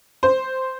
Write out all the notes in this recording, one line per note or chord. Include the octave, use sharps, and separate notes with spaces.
C5